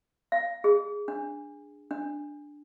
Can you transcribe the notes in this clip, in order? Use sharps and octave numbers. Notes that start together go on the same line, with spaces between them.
F5
G#4
D4
D4